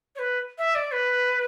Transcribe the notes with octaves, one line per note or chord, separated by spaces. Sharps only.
C#5
B4
E5
D5
B4